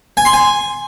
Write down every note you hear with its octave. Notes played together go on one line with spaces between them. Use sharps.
G#5
C6
G#5